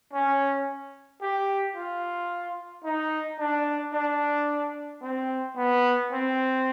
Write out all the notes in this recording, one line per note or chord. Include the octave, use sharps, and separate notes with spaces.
C#4
G4
F4
D#4
D4
D4
C4
B3
C4